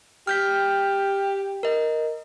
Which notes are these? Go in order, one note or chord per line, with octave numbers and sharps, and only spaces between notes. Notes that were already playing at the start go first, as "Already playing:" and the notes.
G4 F6 G6 B6
A#4 D#5